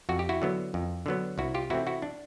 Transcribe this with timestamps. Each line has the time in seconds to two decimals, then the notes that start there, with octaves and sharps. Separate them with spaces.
0.09 F2 F#4
0.19 G4
0.29 E4 F#4
0.42 D3 F#3 B3
0.74 F2
1.06 D3 F#3 B3
1.38 C2 E4 F#4
1.54 F4 G4
1.70 C3 E3 A3 C4 E4 F#4
1.87 E4 F#4
2.02 D4